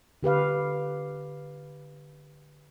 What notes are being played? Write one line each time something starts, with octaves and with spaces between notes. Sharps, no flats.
D3 G4 B4 F5